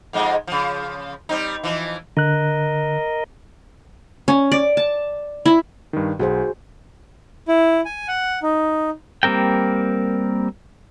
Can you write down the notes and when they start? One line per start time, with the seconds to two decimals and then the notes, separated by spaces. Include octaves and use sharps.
0.13 F2 G#2 G#3
0.47 C#3 F3
1.29 G3 C4 D#4
1.63 E3 F3
2.17 D3 A#4 D#5 F#6
4.28 C#4
4.52 D5
4.77 A5
5.46 E4
5.93 G2 D#3
6.19 B1 F#4 G#4 C5
7.48 E4
7.85 G#5
8.08 F#5
8.43 D#4
9.23 G3 A#3 C4 A#4 G5